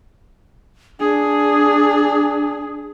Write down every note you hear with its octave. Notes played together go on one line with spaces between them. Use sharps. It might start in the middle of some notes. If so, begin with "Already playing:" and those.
D4 G#4